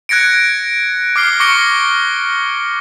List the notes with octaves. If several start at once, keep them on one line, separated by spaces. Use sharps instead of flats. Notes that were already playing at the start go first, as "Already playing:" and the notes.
F#6 G#6 A#6 C#7 D7
D6 F6 C7 G7
C#6 D6 A#6 C#7 G7